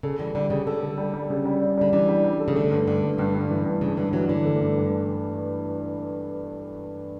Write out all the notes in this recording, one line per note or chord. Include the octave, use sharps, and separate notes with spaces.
C#3 A4
E3 G3
D3 G3
C#3 G3
D3 A4
A4
G3
G3
C#3
G3
G3
D3 G3
E3 D4
G3
G3
A4
C#3
D3 A3
G2
G2 D3
G2
G2 D3
G2
E3
G2
G2 C#3
G2 D3
E3 F#3
D3 E3
A3
G2
G2